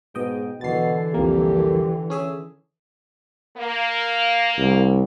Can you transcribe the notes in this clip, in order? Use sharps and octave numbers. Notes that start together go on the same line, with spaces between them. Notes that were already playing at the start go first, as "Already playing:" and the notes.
G#2 B2 D#5 G5
B2 D3 E3 A6 C7
C2 F2 A#3 G4
C#4 G#4 E5
A#3
C2